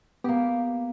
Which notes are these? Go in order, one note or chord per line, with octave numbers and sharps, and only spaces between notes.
A#3 B3 G4